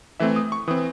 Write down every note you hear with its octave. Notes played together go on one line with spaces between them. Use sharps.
E3 A3 C4 E5
D#6
C#6
E3 C4 D#6